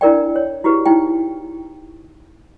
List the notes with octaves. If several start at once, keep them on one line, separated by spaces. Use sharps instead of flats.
D4 E4 A#4 D5 G5
C#5
E4 F#4 G4 B4
D#4 E4 G5